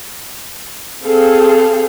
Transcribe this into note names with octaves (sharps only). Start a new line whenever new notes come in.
C4 G#4 A4 F5